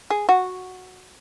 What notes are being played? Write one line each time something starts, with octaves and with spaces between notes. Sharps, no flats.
G#4
F#4